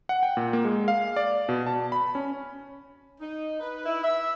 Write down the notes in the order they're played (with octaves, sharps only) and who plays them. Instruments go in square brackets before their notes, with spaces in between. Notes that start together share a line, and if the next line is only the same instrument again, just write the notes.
[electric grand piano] F#5
G5
A#2
A#3
G#3
F5
D5
B2
A5
B5
C#4
[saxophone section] D#4
B4
E4
E5